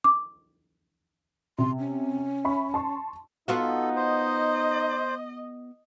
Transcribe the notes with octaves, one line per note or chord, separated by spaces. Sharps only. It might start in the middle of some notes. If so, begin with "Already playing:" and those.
D6
C3 C6
C#4
E5 B5 C#6
A5 C6 C#6
B3 D#4 F4 F#4 A4
C5 D#5